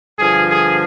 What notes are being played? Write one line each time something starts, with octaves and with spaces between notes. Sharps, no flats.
G2 D3 F3 G#4
G#4